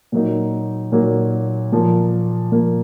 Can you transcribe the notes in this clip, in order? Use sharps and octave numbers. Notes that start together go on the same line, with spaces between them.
A#2 F#3 A#3 D#4
A#2 F#3 A#3 D#4
A#2 F3 A#3
A#2 F3 A#3